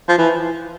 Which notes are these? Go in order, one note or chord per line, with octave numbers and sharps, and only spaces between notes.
F3
E3